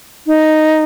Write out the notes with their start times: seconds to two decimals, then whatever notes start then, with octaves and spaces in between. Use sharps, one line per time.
0.27 D#4